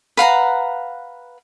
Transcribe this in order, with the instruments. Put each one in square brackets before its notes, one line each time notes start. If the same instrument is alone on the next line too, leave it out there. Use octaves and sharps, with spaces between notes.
[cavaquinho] B4 F5 F#5 A#5